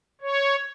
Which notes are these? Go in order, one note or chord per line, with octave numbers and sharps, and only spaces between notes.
C#5